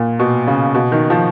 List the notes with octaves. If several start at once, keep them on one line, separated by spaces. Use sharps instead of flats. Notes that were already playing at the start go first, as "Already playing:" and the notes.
Already playing: A#2
B2
C#3
B2
D#3
F3